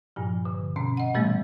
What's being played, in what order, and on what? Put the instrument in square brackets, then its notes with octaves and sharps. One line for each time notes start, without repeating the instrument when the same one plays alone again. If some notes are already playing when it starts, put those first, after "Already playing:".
[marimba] G2 A#2 F3
D3
B2 C4 C#4
D#5 F#5
A#2 E3 G3 A3 B3